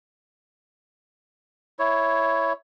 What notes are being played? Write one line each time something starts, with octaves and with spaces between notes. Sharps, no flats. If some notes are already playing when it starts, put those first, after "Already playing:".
E4 C#5